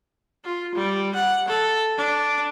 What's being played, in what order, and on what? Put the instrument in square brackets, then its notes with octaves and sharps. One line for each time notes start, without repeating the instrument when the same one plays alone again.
[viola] F4
G3
F#5
A4
D4